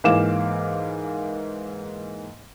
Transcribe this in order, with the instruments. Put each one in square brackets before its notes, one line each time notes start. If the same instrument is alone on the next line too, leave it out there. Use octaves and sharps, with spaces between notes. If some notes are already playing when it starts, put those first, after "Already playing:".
[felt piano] G#2 E3 A#3 F5 D6 E7